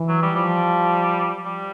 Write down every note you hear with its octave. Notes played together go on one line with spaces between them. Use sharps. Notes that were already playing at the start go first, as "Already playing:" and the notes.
Already playing: E3
F#3
G3
F3 G3
G3